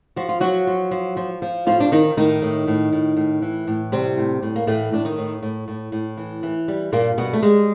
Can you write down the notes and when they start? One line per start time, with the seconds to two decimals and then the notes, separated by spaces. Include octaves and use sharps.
0.16 F3 F#4
0.29 F4
0.40 F3 F#3 F#4
0.67 F3
0.91 F3
1.17 F3
1.42 F3
1.66 A2 F3 F4
1.80 D4
1.92 D#3 F3 D#4
2.17 A2 D#3 D#4
2.42 A2
2.67 A2
2.92 A2
3.17 A2
3.42 E3
3.67 A2
3.92 C3 G3 C4
4.17 A2
4.42 A2
4.56 A#3
4.67 A2 E3 A3
4.92 A2 D4
5.05 D#3 D#4
5.18 A2
5.42 A2
5.68 A2
5.92 A2
6.17 E3
6.43 E3
6.68 G3
6.92 G2 A#2 A#3
7.18 B2 G3 B3
7.33 A3
7.42 G3 G#3